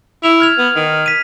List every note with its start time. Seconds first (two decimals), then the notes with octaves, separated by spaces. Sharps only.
0.23 E4 F7
0.40 F6 G#6 F7
0.58 B3
0.76 D#3
1.06 B6 D#7